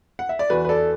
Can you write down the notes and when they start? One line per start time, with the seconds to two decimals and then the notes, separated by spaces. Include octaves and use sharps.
0.19 F#5
0.29 E5
0.39 D5
0.50 E2 F#4 B4
0.65 B4
0.69 A4 D5